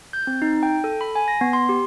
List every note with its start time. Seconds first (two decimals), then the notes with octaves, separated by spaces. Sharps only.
0.13 G6
0.27 C4
0.42 D#4
0.63 G5
0.84 A4
1.01 B5
1.15 G#5
1.28 A#6
1.41 B3
1.53 C6
1.69 G4